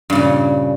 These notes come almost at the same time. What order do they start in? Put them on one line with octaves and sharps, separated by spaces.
G2 C#3 A#2